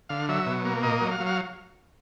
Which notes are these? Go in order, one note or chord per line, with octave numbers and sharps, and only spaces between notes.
D3 F5
F#3 E5
B2
A#3
A#2 D#5
F#3
F5
F#3
F5